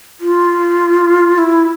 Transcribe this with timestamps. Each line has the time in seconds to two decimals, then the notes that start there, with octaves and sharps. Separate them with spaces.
0.20 F4
1.38 E4